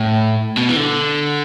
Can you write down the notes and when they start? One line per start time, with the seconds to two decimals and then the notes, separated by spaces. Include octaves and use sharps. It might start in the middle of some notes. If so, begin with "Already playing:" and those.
Already playing: A2
0.57 B2
0.69 E3
0.76 D3